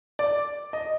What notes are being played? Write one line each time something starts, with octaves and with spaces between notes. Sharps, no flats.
D5
D#5